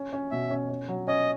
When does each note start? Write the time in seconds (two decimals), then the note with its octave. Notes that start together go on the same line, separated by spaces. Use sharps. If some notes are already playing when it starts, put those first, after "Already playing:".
Already playing: C#4
0.13 C#4
0.31 B2 E5
0.50 C#4
0.69 C#4
0.88 F#3
1.08 C#4 D#5